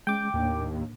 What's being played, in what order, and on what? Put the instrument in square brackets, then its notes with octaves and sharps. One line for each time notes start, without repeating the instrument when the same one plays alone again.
[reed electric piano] G#3 C#4 [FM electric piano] G5 D6
[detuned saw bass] D#2 [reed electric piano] A2 A#3 D4